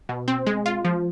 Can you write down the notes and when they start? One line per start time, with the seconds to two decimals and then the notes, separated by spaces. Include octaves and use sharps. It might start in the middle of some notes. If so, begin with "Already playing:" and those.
0.09 B2
0.28 C4
0.47 G#3
0.66 F4
0.85 F3